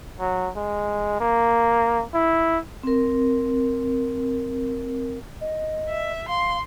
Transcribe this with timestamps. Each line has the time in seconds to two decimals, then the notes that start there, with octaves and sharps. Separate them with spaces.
0.20 F#3
0.57 G#3
1.20 A#3
2.14 E4
2.83 C4 A#4
5.41 D#5
5.89 E5
6.28 F5 C6